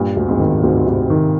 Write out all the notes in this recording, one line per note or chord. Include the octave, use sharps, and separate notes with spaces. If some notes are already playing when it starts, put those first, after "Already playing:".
Already playing: G2 A#2
D2
F2 G#2
D#3
D2 G#2 C3
C3
D#3